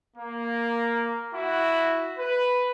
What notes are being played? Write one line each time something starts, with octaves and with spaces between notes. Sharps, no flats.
A#3
E4 F#4
B4